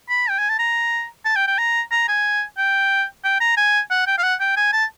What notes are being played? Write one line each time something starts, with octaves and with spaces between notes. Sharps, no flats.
B5
G5
G#5
A5
A#5
A5
G5
G5
A#5
A#5
G#5
G5
G5
A#5
G#5
F#5
G5
F5
F#5
G5
G#5
A5